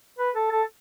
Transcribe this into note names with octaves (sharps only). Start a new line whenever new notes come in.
B4
A4
A4